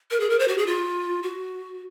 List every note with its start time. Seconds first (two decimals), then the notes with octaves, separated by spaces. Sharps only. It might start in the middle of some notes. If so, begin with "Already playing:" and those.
0.11 A#4
0.20 G#4
0.30 A#4
0.39 C5
0.48 F#4
0.58 G#4
0.67 F4
1.23 F#4